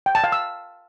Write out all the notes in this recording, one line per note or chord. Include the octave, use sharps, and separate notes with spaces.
G5
A5
F5
E6